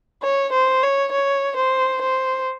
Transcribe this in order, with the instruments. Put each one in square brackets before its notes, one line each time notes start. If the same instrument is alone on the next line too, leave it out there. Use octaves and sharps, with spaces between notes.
[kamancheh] C#5
C5
C#5
C#5
C5
C5